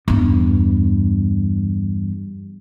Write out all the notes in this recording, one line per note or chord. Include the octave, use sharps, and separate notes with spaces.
E2 G2